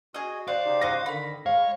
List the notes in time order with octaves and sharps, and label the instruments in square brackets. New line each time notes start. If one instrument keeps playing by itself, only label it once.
[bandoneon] F#4 [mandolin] G#4 D#5
[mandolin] C5 D5 F#5 [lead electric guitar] F5
[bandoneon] C#3 D#4 G4
[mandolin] F#4 C5 D#5 [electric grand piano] A#6
[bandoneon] D3 D#3 [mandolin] B5
[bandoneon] G#3 [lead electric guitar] C#5 [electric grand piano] F5